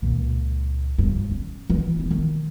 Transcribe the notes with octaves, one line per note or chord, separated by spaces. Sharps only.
C#2 A#2
G2 C#3
C#4
E3
D#1 E4
D#3